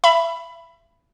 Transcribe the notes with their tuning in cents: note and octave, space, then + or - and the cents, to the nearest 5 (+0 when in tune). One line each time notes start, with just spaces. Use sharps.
E5 +30 B5 +0